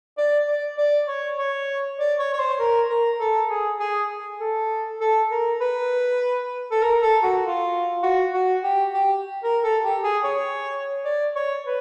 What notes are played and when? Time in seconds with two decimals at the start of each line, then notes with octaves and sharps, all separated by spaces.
0.17 D5
0.48 D5
0.77 D5
1.08 C#5
1.39 C#5
1.99 D5
2.19 C#5
2.34 C#5
2.39 C5
2.59 A#4
2.89 A#4
3.20 A4
3.50 G#4
3.80 G#4
4.40 A4
5.00 A4
5.31 A#4
5.61 B4
6.71 A4
6.82 A#4
7.02 A4
7.23 F#4
7.43 F4
8.03 F#4
8.34 F#4
8.63 G4
8.94 G4
9.43 A#4
9.64 A4
9.83 G4
10.04 G#4
10.24 C#5
11.05 D5
11.36 C#5
11.65 B4